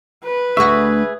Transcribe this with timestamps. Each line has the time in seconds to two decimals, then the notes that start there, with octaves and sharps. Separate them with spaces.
0.24 B4
0.57 D2 A3 F#4 G#4 E5 C#6